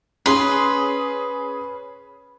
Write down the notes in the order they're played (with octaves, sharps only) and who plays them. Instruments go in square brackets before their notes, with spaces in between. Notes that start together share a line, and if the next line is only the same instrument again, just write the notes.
[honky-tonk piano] C#4 G#4 [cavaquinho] B4 C6